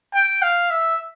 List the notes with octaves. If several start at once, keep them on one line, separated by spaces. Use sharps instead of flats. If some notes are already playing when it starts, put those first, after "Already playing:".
G5
F5
E5